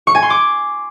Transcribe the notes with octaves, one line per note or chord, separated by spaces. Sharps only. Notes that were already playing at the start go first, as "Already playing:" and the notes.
C#6
G#5
C6
D6